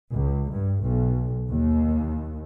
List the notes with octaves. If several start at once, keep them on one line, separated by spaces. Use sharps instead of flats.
C#2
G2
B1
D#2